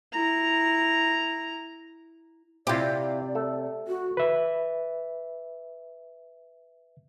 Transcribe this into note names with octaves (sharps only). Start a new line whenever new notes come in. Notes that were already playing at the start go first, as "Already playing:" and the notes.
E4 A#5
C3 C4 E4 F4 G4 D5
A3 A4
F#4
B4 E5